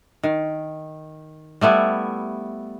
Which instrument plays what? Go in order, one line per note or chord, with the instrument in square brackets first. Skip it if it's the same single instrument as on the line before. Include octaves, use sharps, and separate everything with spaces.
[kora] D#3
G3 A3 B3 E4